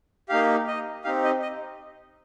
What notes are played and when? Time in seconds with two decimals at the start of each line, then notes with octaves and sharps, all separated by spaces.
0.29 A#3 D#4 G4 F5
0.67 D#5
1.04 C4 D#4 G4 F5
1.24 D#5
1.42 D#5